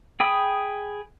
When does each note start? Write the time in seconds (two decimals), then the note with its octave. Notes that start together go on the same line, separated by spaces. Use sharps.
0.20 G#4 G5 B5 D#6